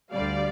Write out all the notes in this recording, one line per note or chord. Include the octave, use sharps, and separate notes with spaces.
D2 D3 G3 D5 F5